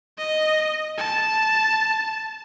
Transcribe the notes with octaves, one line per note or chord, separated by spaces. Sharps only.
D#5
A5